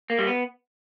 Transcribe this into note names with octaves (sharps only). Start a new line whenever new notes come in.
A#3
G3
B3